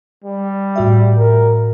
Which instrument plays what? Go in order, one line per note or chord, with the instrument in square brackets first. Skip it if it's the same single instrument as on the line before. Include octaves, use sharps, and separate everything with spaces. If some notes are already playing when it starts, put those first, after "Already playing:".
[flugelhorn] G3
[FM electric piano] A2 F#4 E5
[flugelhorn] A#4